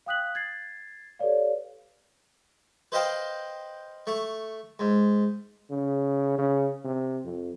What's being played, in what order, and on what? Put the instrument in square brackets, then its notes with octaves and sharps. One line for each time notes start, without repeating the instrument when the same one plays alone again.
[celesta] F5 G5 D#6 F#6 B6 F#7
G#6 A6 C7
G4 A4 B4 C#5 D5 F5
[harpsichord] B4 C5 D#5 F5 G5 A5
A3 C#6
G#2
[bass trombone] C#3
C#3
C3
F2